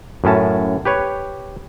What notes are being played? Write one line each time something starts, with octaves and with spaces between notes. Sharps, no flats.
F#2 A2 C#4 A5
G4 B4 C#5